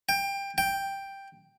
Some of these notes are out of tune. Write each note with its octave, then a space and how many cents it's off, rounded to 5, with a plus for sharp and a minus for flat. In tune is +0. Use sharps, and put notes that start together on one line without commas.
G5 +20
G5 +5